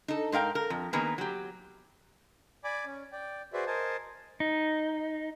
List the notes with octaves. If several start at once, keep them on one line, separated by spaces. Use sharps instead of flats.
D#4 A4
G#2 A#4 F5 G5
A#4
F2
D#3 A#3 B3 G#4 A#4 B4
F#3 G4
D5 G#5 B5 D6
C#4
D5 G5
F#4 G#4 B4 C5 D5 E5
A#4 C5 D#5 G#5 A5
D#4